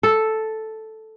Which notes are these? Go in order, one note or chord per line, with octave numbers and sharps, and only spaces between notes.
A4